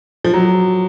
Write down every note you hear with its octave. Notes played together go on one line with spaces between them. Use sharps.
F3
F#3